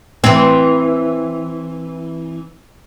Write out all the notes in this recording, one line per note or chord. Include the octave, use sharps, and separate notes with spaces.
E3 C4